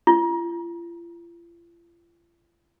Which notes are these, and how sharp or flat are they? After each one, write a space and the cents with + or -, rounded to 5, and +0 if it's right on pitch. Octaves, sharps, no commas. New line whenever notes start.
F4 -40